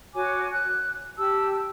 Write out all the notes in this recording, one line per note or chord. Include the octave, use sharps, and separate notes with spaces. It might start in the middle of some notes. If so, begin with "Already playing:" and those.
F#4 C#5 G#5 D6
F#6
G4 A5 E6